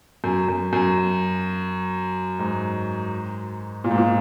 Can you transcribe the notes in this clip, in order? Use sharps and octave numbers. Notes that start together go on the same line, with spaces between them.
F#2
F#2
F#2
G#2
A#2
G#2
A#2